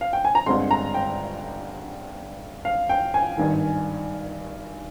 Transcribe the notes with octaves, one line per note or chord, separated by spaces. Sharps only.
F5
G5
G#5
A#5
G1 G2 D3 G#3 C4 C6
A#5
G5
F5
G5
G#5
G#1 G2 D#3